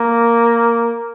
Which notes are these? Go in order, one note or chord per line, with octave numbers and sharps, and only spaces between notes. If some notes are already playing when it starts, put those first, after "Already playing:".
Already playing: A#3